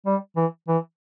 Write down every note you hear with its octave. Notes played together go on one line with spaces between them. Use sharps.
G3
E3
E3